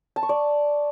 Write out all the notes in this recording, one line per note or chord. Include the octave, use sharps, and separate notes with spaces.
A5
C#6
D5